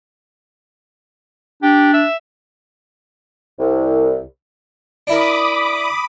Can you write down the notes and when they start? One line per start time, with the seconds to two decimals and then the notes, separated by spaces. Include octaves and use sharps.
1.63 D4 G4
1.94 E5
3.60 C2
5.07 D4 E4 A#4 B5 D6 D#6